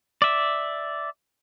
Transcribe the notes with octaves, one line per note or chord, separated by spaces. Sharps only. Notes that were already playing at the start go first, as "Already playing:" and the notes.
D5 E5